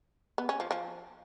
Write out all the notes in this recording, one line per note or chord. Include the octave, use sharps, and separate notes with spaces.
B3
C#4
F3
F3